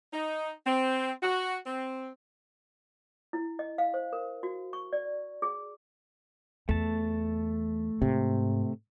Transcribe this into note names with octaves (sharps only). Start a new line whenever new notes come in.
D#4
C4
F#4
C4
E4
D#5
F5
C5
A#4
F#4
C#6
D5
G#4
E2 A3 A5
G#2 C3